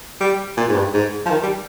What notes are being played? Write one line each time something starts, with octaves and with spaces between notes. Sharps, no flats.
G3
A#2
G#2
G2
G#2
F3
D#3
G3